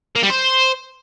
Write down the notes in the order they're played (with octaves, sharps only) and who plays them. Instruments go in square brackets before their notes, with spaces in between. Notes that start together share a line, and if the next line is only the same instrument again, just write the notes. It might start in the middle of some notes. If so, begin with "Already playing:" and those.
[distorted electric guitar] A#3
G3
C5